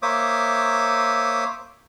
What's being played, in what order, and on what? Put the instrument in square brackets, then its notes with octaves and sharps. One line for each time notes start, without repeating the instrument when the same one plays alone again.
[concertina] A#3 C5 C#5 E5 D6 D#6